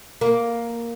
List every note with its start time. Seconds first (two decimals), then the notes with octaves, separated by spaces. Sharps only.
0.21 A#3